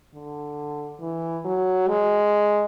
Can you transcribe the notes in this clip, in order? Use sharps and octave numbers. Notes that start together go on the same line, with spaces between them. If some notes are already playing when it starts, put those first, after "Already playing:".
D3
E3
F#3
G#3